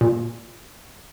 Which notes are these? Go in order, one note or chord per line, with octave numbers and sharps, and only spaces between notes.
A#2